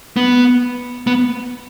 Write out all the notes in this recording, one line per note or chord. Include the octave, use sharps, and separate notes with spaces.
B3
B3